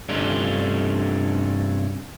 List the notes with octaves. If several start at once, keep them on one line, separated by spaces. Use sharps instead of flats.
G2 C3 A3 C#4 D4 F4